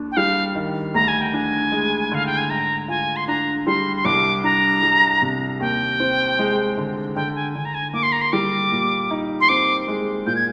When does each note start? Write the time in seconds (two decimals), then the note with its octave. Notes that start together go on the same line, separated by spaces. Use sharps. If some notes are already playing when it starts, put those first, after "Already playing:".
Already playing: D#2 D4
0.12 G5
0.17 G3 F5
0.55 D#3
0.94 D2 A#5
1.08 G#5
1.21 G5
1.33 D4 G#5
1.72 G#3
2.12 D3 F5
2.26 G5
2.38 G#5
2.50 G#2 A#5
2.88 F4 G#5
3.16 C6
3.27 D4 A#5
3.66 G3 C6
3.97 C6
4.05 C2 D6
4.44 D4 A#5
4.83 G3
5.22 C3
5.60 D#2 G5
6.00 C4
6.39 G#3
6.78 D3
7.16 D3 G5
7.35 G#5
7.55 D3 G#5
7.65 A#5
7.74 G#5
7.93 A#3 D6
8.03 C6
8.12 A#5
8.22 C6
8.33 G3 D6
8.72 A#2
9.11 D#4
9.41 C6
9.49 C4 D6
9.88 G#3
10.27 A#2 G6
10.36 G#6